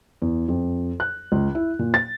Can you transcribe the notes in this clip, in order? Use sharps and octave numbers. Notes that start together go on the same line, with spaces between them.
E2
F2
F#6
C#2
E4
A#2
A6